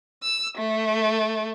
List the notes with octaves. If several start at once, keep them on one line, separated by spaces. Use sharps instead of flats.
E6
A3